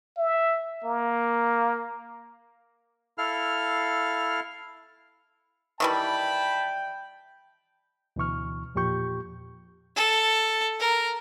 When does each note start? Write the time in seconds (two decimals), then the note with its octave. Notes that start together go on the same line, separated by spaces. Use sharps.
0.17 E5
0.84 A#3
3.18 E4 A4 F5 F6
5.80 D#3 E3 G3 G5 A5 B5
8.16 D2 B2 E3 C#6 F6
8.75 E2 A#2 F3 G4 C#6 G6
9.96 A4
10.80 A#4